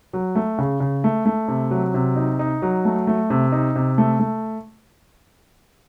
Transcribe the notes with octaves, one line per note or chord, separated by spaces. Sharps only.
F#3
A3
C#3
C#3
A3
A3
C3
F#3
C3
D#4
D#4
F#3
A3
A3
C3
D#4
C3
A3
A3